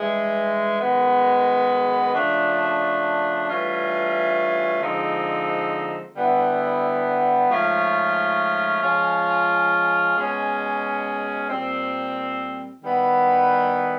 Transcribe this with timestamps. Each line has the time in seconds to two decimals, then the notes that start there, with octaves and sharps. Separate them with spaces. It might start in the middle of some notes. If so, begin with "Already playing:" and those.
Already playing: G2 E3 G#3
0.80 F#2 D#3 G#3 B3
2.14 C#3 F3 A3 D4
3.48 G2 E3 A3 C#4 F4
4.81 D3 F3 G#3 C4 D#4
6.14 D3 G3 B3 E4
7.49 G#2 F3 A3 C#4 F4
8.82 F3 G#3 C#4 F4
10.15 B2 G#3 C#4
11.49 A#2 G3 C4
12.82 D#3 G3 B3 E4